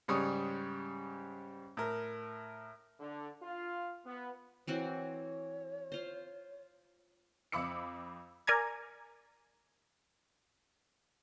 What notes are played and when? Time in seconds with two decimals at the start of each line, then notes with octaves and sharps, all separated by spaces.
0.08 G#2 C#3 G3 C#5 D#6
1.77 A2 A#4
3.00 D3
3.43 F4
4.05 B3
4.67 E3 C4 F#4 C#5
5.92 F4 C5
7.52 F2 F5 B5 D6 E6 C#7
8.47 A#4 D5 G#5 A#5 G#6